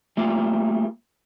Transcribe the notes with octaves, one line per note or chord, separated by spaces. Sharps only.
G3 A3 A#3 F4